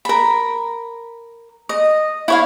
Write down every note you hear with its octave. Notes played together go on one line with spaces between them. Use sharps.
A#4 B5
D#5
E4 C#5 F5